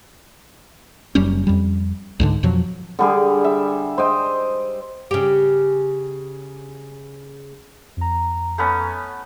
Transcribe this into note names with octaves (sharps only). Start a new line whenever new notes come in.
F#1 F#2 G3 C#4
F2 G3
C#2 G#2 D3
F2 B2 F3 F#3
D3 G3 G#4
E5
C5 D#5 G5
C#3 G4
F2 A#5
A3 B3 C#4